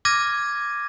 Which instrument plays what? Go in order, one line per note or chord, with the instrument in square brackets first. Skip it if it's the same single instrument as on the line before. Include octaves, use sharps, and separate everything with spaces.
[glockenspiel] D6 F6 G#6 A#6 D#7